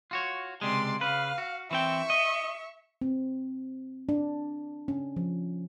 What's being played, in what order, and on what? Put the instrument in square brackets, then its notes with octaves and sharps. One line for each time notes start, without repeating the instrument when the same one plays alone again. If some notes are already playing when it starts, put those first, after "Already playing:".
[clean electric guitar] F4 F#4 C#5
[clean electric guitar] C#2 C3 G#3 [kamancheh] D5 C6
[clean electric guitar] C#3 B4 [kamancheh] F5
[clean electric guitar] F#4
[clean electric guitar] E3 C4 G5 [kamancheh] E5 C#6
[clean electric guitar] D#5
[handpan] C4
D4
C#4
F3